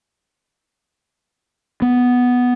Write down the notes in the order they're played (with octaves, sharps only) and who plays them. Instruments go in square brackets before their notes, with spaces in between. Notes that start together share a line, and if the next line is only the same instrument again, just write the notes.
[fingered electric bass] B3